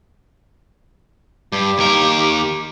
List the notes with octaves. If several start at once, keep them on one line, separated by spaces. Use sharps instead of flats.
G2 G4
D#2 A#4